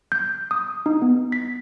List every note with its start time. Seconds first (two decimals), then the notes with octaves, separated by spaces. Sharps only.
0.12 G6
0.51 D#6
0.86 D#4
1.02 B3
1.32 B6